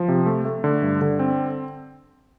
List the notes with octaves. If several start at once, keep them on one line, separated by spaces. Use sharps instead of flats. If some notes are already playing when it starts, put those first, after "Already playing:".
Already playing: F3
C3
A3
A3
D3
G2
D3
C4